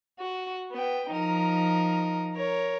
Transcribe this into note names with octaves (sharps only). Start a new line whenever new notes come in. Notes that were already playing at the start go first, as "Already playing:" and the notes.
F#4
B3 G5
F3 D#4 A#4
A#4 C#5